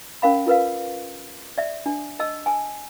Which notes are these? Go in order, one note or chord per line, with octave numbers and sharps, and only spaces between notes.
C#4 A#4 F5 B5
F4 A#4 B4 F5
D5 E5
D4
D#5 A5 E6
G#5 A5